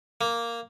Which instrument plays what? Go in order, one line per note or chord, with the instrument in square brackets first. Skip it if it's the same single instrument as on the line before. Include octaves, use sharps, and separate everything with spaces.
[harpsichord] A#3